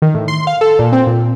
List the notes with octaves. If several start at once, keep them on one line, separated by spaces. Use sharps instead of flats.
D#3
A2
C6
F5
A4
A#2
C4
A#2